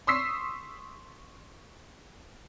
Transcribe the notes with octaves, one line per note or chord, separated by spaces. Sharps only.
C6 C#6 D#6 E6 B6 C7